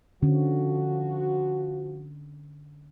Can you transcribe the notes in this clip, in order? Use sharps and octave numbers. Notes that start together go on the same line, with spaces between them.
D3 F3 C#4 F#4